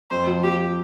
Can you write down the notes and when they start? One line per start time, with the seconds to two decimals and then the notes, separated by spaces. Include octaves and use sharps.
0.11 F2 C5
0.27 F3
0.44 F3 G4